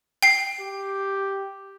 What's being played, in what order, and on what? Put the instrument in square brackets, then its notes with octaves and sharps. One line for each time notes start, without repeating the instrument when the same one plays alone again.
[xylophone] G5 C7
[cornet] G4